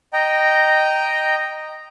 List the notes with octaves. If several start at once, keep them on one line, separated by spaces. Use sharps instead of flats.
D#5 G5 A#5